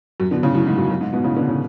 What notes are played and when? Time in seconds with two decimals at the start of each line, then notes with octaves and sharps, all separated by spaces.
0.20 F#2
0.31 B2 D3
0.43 A2 C#3
0.54 F#2 A2
0.66 G#2
0.78 F#2
0.90 F#2
1.01 G#2
1.12 G#2 B2
1.24 A2 C#3
1.36 B2 D3
1.48 C#3 E3